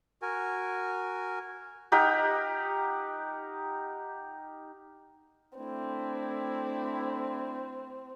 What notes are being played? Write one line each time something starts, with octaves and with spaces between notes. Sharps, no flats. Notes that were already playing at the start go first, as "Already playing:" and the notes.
F#4 A#4 G#5
D#4 G4 A#4 F#5
A3 C4 D4 E4